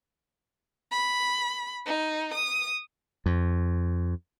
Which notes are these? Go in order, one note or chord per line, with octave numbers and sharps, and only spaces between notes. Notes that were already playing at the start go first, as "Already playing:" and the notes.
B5
D#4
D#6
F2